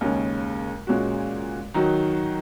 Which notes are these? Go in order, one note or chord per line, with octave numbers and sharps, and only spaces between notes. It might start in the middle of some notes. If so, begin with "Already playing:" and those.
D#2 C#3 G#3 C#4
A#2 G#3 C#4 F#4
D#3 F#3 D#4 F#4